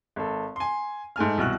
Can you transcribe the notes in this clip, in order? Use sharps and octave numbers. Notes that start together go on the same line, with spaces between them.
G#1 A4
G#5 C6
G#2 A3 G#5 F6
C2 B2 E3 F#4 F6 F#6